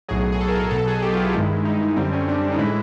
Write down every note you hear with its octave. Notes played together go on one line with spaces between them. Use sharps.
B1 A2 F#3 G#4
G#4
A4
A#4
A4
B1 B2 F#3 A4
G#4
G4
F4
E4
G2 D#3 G#3
D#4
F#2 D3 G3 C4
C#4
D4
D4
D#4
A2 E3 G#3 E4